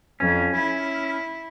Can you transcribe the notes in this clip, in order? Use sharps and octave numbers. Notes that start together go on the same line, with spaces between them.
F2 C#4
E4